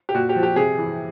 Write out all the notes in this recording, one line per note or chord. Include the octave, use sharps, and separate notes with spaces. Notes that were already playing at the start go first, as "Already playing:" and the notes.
G4
A#2 F#4
G4
F3
G4
C3 G#4
E3